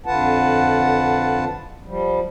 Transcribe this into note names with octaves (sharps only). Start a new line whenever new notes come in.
F2 D3 F4 B4 F#5 A5
F3 G3